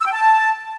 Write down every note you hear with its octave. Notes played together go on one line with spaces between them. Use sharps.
E6
G5
A5